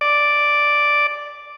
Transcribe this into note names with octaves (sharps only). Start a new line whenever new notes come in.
D5